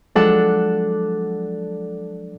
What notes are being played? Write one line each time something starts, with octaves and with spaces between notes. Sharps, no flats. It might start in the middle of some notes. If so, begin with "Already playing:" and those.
F3 F#3 G#3 D4 A4 F#5